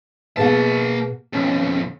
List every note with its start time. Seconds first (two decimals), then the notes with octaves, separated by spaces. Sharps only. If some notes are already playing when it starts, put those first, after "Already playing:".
0.37 B2 A#3 G#4 F5 A5
1.33 B1 F2 C#4